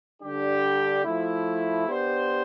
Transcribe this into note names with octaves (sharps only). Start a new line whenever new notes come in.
D3 G3 D4 G4
F3 A3 E4
B3 D4 G4 C5